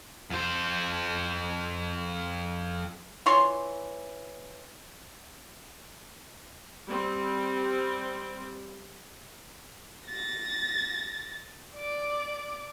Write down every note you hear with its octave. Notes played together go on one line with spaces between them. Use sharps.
F2 C5
E3 F4 C#5 C6
G3 C4
A6 A#6
D5 D6